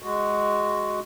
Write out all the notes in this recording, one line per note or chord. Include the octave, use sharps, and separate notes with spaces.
G#3 F#4